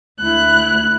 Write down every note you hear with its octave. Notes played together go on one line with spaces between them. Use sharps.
D2 E4 F#6